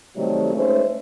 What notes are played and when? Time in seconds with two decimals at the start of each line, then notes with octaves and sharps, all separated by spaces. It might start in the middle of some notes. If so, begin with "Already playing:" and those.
0.16 C3 D#3 F#3 G3 A3
0.55 G#3 A3 C#4 D#4 B4 C5